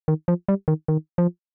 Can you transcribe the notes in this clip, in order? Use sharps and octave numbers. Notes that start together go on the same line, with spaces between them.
D#3
F3
G3
D#3
D#3
F3